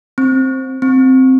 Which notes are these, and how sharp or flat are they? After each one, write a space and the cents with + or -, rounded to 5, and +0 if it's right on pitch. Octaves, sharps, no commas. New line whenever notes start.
C4 +10
C4 -5